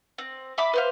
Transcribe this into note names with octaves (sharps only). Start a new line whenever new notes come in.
C4
E5 B5 D6
B4 C5 F5